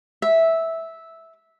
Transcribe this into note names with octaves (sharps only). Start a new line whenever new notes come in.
E5